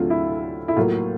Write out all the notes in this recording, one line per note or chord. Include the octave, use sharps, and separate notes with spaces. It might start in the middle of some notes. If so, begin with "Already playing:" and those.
Already playing: D2 D3 F#3 A3 C4 F4
E4
E4
A2 F#3 A#3 F4